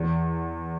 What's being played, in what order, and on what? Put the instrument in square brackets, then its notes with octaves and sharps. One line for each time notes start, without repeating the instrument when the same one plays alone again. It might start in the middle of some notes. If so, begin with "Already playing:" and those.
Already playing: [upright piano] E2